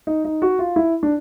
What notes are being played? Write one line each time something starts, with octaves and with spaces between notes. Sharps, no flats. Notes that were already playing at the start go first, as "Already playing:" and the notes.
D#4
D#4
F#4
F4
E4
D4